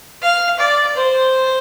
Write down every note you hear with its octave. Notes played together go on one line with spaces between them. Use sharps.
F5
D5
C5